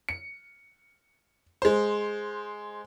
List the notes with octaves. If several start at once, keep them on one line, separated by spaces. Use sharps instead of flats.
C#7
G#3 C5